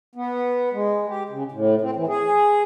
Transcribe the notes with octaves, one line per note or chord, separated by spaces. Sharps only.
B3
G#3
G4
C#3
A2
C4
E3
G#4